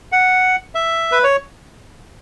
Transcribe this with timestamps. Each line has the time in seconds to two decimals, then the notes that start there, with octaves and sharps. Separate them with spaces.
0.12 F#5
0.75 E5
1.12 B4
1.24 C#5